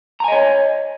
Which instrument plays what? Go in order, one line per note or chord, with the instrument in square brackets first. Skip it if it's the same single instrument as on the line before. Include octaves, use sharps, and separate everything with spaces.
[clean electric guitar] A#5
G#5
D#5
C#5